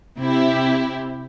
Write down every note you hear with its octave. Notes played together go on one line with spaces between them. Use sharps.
C3 E4 G4